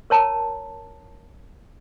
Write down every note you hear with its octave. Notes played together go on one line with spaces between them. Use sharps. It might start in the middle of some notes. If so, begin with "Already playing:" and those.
A#4 C#5 A5 A#5